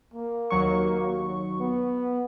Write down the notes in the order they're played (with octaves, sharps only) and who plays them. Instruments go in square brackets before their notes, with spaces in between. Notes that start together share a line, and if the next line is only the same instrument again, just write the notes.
[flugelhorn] A#3
[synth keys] D#2 F#3 C#6
[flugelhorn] B3